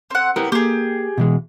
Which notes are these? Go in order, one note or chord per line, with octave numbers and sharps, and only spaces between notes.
C4 F#5
B3 E4 G4 A#4
A#3 G4 G#4
B2 E3 G#3